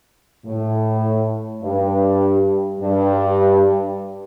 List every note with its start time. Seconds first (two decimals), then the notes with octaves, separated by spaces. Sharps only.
0.45 A2
1.63 G2
2.80 G2